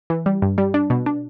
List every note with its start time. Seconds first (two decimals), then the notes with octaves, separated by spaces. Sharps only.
0.10 E3
0.26 G3
0.42 G2
0.58 G3
0.74 D4
0.90 B2
1.06 D4